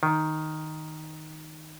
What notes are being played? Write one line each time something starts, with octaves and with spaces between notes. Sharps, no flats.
D#3